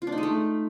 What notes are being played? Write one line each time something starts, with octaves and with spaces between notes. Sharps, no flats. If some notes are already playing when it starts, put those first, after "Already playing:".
F4
D4
D#4
G#3
A3